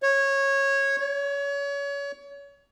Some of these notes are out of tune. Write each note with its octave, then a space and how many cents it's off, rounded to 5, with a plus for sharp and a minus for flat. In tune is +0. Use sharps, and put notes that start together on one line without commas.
C#5 -15
C#5 +30